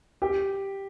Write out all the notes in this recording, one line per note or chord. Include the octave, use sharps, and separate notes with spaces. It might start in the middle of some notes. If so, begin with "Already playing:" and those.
G4